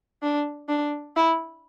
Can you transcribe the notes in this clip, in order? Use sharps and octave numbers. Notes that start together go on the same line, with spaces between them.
D4
D4
E4